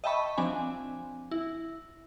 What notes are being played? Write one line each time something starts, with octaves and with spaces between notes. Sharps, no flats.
D#5 E5 G5 A5 B5 C#6
F3 C4 D4 G#5
E4